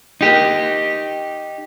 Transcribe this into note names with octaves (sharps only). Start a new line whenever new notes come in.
D#4 G4